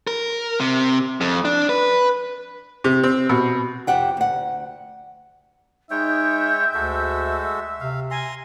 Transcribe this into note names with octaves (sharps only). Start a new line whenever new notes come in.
A#4
C3
F2
D4
B4
C3
C4
B2
F2 C3 G4 F#5 G5
D2 F#5
G#3 D#4 C#5 E5 G5 G6
D2 G#3 F#4 A4
C3 F5
G#5 A#5 C6